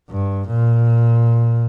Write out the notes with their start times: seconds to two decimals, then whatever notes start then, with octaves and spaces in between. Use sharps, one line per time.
0.09 G2
0.47 A#2